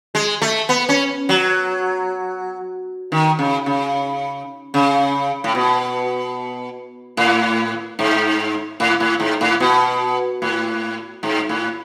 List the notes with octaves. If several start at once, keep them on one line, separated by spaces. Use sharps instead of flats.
G#3
A3
B3
C#4
F#3
D#3
C#3
C#3
C#3
A2
B2
A2
G#2
A2
A2
G#2
A2
B2
A2
G#2
A2